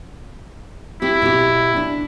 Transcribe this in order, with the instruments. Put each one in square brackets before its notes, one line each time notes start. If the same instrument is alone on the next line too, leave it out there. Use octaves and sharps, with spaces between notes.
[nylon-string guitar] C4 G4 [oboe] E4
[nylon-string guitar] B2 G4
D4